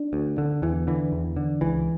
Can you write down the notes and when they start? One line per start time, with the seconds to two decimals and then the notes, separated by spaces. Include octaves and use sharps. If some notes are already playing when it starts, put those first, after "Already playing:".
Already playing: D4
0.13 D2
0.38 D3
0.62 E2 E3
0.87 D3 E3
1.12 E2
1.36 D3
1.61 C#2 E3